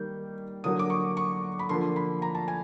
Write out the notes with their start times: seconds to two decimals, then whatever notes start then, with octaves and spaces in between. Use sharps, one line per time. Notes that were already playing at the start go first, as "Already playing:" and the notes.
Already playing: D#3 G3 A#3 G6
0.64 D3 F#3 A#3 D#6
0.79 D6
0.90 C#6
1.17 C#6
1.59 B5
1.69 D3 F3 A#3 C6
1.96 B5
2.22 A#5
2.35 A5
2.48 G#5